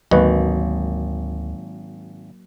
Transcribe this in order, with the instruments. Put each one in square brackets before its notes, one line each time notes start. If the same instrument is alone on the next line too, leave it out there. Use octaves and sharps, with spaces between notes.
[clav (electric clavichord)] G#1 [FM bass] D2 [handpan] F#3 A#3 [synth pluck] B4 D#5 C#6